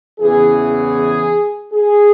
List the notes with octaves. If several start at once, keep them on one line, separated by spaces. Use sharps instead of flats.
E2 C#3 E3 G#4
G#4